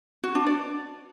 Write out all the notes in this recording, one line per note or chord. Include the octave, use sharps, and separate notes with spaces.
F#4
D4
D5